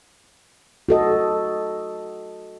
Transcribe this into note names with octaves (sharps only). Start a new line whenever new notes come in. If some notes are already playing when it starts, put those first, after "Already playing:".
F#4 A4 D#5